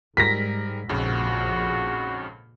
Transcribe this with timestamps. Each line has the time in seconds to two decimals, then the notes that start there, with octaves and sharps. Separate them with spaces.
0.17 G#2 G3 A#4 A#6 B6
0.89 A#1 F2 G#2 C#3 F#4